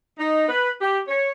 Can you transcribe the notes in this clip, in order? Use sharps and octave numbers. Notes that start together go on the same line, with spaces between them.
D#4
B4
G4
C#5